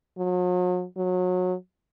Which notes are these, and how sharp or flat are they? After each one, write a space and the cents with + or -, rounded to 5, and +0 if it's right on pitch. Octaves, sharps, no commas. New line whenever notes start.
F#3 -40
F#3 -25